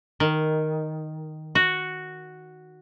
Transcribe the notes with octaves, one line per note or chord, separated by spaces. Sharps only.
D#3
F#4